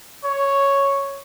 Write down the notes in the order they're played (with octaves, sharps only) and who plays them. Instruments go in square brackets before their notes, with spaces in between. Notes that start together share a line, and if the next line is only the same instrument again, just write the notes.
[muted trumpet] C#5